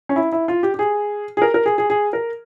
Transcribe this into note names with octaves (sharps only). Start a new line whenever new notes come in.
C#4
E4
E4
F4
G4
G4
G#4
G#4
A#4
A#4
G#4
G#4
G#4
A#4